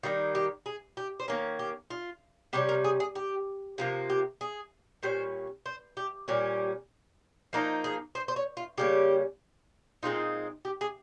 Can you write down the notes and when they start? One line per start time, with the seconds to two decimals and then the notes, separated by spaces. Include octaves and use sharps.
0.03 D#3 G3 A#3 D#4 F4
0.35 G4
0.66 G#4
0.97 G4
1.20 C5
1.28 D#3 A#3 C#4 A#4
1.59 G4
1.90 F4
2.53 C3 G3 C#4 G4
2.69 A#4
2.84 G#4
3.00 G#4
3.15 G4
3.78 C3 F3 A#3 F4
4.10 G4
4.41 G#4
5.03 A#2 G3 C#4 C5
5.66 C5
5.97 G4
6.28 A#2 G3 C#4 G4
7.53 F3 A#3 D#4
7.84 G#4
8.15 C5
8.28 C5
8.36 C#5
8.57 F4
8.78 C#3 G3 A#3 C#4 G4
10.03 A#2 G#3 C4 D#4 F4
10.65 G4
10.81 G#4